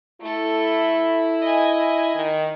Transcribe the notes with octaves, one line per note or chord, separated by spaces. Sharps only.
A3 E4 A4
D#5 G#5
D#3